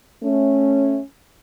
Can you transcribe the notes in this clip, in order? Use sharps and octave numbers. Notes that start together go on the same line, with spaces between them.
A3 C#4